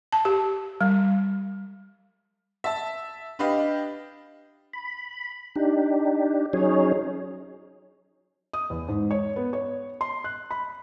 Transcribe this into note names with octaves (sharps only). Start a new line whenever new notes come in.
A5
G4
G3
E5 A5
D4 G4 B4 D#5 F5
B5
D4 D#4 G4
F#3 C#4 D#4 G#4 C#5
D#6
E2
G#2
C#5
B3
C#5
C6
F#6
B5